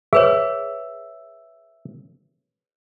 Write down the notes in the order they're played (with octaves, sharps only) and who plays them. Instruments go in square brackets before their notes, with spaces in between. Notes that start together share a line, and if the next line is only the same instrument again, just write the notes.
[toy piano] G#4 B4 C#5 [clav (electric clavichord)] E5